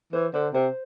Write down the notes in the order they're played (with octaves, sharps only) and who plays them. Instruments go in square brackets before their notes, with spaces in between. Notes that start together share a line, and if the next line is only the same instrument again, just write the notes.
[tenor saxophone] E3 [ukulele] C5
[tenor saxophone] D3 [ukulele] C5
[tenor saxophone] C3 [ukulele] C5